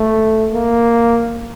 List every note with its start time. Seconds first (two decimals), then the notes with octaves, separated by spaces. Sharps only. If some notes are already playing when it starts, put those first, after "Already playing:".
Already playing: A3
0.54 A#3